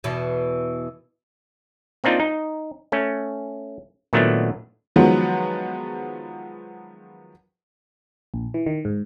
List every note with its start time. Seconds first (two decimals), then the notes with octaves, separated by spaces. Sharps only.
0.04 E2 B2 E3
2.04 A#3 C4 D4 D#4 F4
2.20 D#4
2.92 A3 C#4
4.13 A#2 D#3 F#3 A3 B3 D4
4.96 D#3 F3 F#3 G#3 B3
8.34 A#1
8.54 E3
8.66 D#3
8.85 G#2